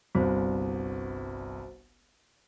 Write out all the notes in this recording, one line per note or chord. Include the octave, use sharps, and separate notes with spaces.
G1 C2 F#4 C5